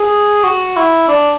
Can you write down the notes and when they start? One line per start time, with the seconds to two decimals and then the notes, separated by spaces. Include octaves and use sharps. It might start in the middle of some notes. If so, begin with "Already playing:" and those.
Already playing: G#4
0.44 F#4
0.76 E4
1.08 D4